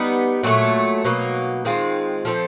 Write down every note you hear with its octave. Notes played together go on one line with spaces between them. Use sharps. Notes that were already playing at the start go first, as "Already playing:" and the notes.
Already playing: G3 B3 D#4
A#2 F#3 A3
B2 F#3 A#3 D#4
D#3 G#3 C4 F4
F3 A3 C4